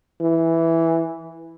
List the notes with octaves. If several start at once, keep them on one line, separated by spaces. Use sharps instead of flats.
E3